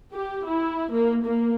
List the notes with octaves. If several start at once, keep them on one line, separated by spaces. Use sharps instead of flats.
G4
E4
A#3
A#3